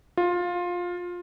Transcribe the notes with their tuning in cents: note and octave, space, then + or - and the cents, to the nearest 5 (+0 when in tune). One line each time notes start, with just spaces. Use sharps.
F4 +15